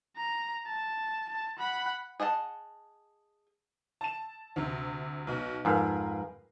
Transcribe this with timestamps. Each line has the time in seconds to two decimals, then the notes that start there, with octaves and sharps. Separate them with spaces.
0.17 A#5
0.66 A5
1.29 A5
1.59 F#5 B5
2.20 G#4 D#5 F#5 A5
4.01 A5 E7
4.56 D2 C3
5.27 B1 B2
5.65 F2 G#2 A#4 B4 F5